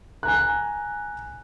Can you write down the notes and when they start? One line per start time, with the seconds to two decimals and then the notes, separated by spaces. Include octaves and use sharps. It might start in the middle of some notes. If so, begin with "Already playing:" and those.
0.23 G#5 A#5 F#6